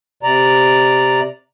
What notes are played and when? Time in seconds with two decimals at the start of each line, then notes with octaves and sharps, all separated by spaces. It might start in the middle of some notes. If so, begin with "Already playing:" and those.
0.23 C3 D5 A#5